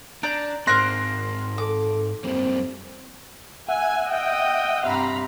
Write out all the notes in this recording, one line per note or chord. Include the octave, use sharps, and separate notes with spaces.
D4 D5 A#5 G6
G#2 C4 A#4 C5 C6 F#6 A#6
A4 D6
F#2 G3 A#3 C4
E5 F#5 G#5
D#5 G5
G2 C3 F5 A#5 B5